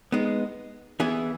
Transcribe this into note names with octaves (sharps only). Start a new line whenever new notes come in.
G#3 B3 D#4
E3 B3 E4 G#4